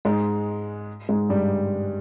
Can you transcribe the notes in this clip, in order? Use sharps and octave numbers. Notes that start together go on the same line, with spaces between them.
G#2 G#3
G#2 G#3
G2 G3